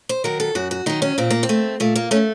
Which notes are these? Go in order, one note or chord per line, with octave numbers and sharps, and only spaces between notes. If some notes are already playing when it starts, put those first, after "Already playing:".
C5
D#3 F#3 A#4
A4
F#2 F#4
F#4
D#3 F#3 D#4
C#4
A#2 C4
A#3
C4
A3
A#2 A3
A#3
A3 C#4